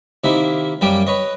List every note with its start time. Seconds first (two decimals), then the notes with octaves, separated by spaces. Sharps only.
0.24 C3 D#3 A#3 E4
0.81 F#2 G3 A#3 G4 G5
1.07 B4 C#5 D#5